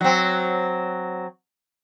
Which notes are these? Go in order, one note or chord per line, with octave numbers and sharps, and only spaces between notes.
F#3 C4